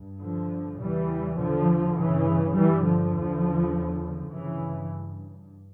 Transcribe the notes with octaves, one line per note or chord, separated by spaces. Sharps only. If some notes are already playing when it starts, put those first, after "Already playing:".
Already playing: G2
D3 F3
E2 C#3 E3 G3
D3 F3
G2 C#3 E3
E3 G3
D3 F3
E2 C#3
G2 C#3 E3